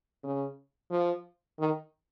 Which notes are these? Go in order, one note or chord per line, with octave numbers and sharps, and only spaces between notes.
C#3
F3
D#3